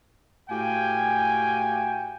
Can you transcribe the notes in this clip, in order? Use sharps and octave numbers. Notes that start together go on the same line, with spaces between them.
A2 F#4 G4 F5 G5 G#5